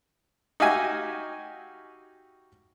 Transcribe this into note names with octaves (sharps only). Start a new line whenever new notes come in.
D#4 F#4 G4 E5 F5 G#5